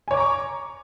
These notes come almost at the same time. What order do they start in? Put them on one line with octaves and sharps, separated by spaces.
G#5 C#5 D6 A#5 C#6